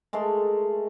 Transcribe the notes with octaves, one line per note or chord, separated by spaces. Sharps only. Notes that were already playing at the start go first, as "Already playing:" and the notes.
G#3 A3 A#4 C6